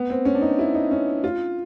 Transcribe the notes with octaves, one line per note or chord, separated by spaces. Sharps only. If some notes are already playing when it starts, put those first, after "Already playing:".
Already playing: B3
C4
C#4
D4
D#4
E4
D#4
C#4
F4